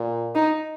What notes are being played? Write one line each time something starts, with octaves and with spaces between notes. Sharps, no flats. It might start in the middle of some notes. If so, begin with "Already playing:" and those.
Already playing: A#2
D#4